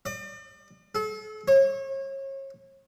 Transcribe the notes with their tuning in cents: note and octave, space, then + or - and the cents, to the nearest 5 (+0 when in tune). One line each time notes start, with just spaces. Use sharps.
D5 +45
A4 -40
C#5 -35